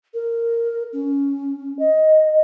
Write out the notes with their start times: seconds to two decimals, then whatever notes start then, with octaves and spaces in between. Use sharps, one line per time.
0.14 A#4
0.92 C#4
1.79 D#5